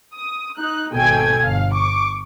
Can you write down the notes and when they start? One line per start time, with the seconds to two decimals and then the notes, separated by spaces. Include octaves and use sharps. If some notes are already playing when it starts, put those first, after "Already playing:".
0.14 D#6
0.58 D#4 F#6
0.95 G#1 B2 A4 G5 G#5 G#6
1.41 G1 F5
1.74 C#6 D6